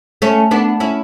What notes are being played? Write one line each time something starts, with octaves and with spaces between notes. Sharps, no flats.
A3 C#4
B3 D4
C#4 E4